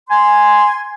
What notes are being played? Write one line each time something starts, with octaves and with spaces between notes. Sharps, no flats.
G#5 C6